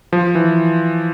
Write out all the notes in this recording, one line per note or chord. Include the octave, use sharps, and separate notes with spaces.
F3
E3